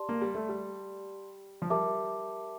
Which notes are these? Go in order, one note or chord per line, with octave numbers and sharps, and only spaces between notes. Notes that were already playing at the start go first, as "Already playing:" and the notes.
Already playing: G4 D5 A5 C6
A#3
G3
A3
G3
F3
G3 A#4 E5 A5 D6